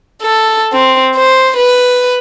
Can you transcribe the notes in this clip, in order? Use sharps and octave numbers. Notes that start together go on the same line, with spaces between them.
A4
C4
C5
B4